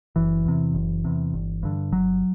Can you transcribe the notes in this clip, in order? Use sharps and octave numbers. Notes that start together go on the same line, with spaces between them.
F#1 E3
E2 C3
F#1
E2 C3
G1
G2 D3
G1 F#3